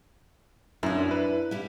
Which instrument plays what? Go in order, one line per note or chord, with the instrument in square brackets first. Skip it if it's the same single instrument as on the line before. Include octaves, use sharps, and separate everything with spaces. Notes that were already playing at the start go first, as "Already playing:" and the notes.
[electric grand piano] F#2 [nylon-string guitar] D4 E4
[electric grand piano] B4
[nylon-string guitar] G3 E4